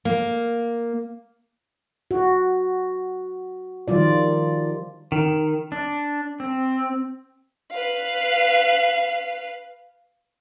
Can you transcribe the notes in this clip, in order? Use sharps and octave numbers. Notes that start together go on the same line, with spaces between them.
A#3
F#4
D#3 F3 G3 F4 D5
D#3
D4
C4
B4 F5